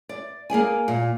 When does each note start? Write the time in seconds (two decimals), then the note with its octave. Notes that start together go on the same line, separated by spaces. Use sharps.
0.09 D5
0.50 A#3 G#4 D5 G#5
0.88 A#2